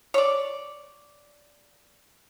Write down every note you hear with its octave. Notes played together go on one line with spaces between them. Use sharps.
C#5 D5